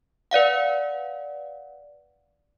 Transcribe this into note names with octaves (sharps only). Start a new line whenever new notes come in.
B4 D5 F5 F#5